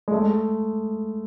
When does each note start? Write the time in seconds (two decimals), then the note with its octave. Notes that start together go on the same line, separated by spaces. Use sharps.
0.08 G#3
0.12 A3